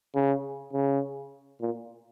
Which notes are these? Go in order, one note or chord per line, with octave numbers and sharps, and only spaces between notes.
C#3
C#3
A#2